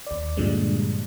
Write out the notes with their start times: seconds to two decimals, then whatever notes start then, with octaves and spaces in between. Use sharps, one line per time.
0.07 D#2 D5
0.37 G2 A#2 D3 F3 G3 G#3